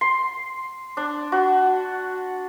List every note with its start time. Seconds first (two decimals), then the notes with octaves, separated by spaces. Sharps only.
0.01 C6
0.97 D4
1.32 F#4